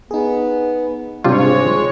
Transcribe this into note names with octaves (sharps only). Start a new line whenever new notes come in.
B3 D#4 G#4
G#2 C3 G3 G#3 D4 F4 C#5